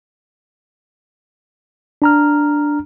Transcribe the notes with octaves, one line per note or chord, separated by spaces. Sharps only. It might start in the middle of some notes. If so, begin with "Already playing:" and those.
D4 A#5 F6